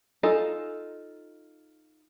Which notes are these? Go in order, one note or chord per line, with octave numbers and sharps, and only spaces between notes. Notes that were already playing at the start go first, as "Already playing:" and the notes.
D#4 F4 A4 D#5 G#5